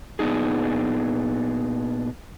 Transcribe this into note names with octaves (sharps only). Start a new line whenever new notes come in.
A#2 B3 D4 D#4 G#4